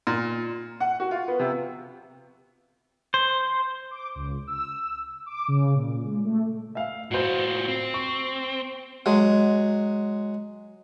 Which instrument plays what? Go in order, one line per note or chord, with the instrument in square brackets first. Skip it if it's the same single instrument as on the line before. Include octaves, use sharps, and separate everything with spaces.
[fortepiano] A#2
[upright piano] F#5
F#4
F4
B3
C3
[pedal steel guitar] C5
[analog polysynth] D6
C#2
E6
D6
C#3
A#2
G#3
A3
[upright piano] E5 F5
[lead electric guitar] A2 F4 [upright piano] F#4 C5
[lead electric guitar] C4
[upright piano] C#6
[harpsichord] F#3 G#3